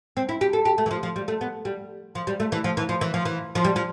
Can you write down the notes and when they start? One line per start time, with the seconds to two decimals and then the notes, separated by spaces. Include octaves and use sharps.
0.17 C4
0.29 E4
0.41 G4
0.53 A4
0.65 G4
0.78 A3
0.86 E3
0.91 F3
1.03 F3
1.16 G3
1.28 A3
1.41 B3
1.65 G3
2.15 F3
2.27 G3
2.40 A3
2.52 E3
2.64 F3
2.77 E3
2.89 F3
3.01 E3
3.14 F3
3.25 E3
3.55 F3
3.65 G3
3.76 F3